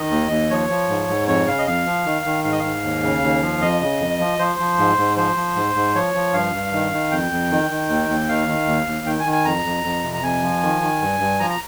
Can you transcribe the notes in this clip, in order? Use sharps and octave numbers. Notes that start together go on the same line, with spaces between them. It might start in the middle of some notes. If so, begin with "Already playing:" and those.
Already playing: D#3 D#5
D#2
D#2
F3 C#5
F3
G#2
G#2
F2 C#5
C#3 F5
D#5
F2 F5
F3
D#3
D#3
G#2 F5
D#5
G#2 F5
D#2
C#3
D#2
F3
F2 D#5
C#3
F2
F3
F3 C5
F3
G#2
G#2
F3 C5
F3
G#2
G#2
F3 C#5
F3
G2 F5
G2
D#3
D#3
F2 G5
F2
D#3
D#3
D#2
D#2
D#3 F5
D#3
D#2
D#2
D#3 G5
G#5
D#3
G#5
F2 A#5
F2
F2
C3
A#5
F2 G#5
F3
D#3
D#3
G2
G2
F3 A#5
A#5